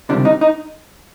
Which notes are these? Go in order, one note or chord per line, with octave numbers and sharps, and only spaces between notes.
C#2 C3 D#3 G3 D4
D#4
D#4